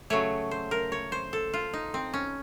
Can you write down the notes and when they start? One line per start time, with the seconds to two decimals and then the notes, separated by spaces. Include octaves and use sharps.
0.10 C#3 F#3 A3 C#5
0.51 C5
0.71 A#4
0.92 C#5
1.12 C5
1.33 A4
1.54 F4
1.73 D#4
1.94 C4
2.14 C#4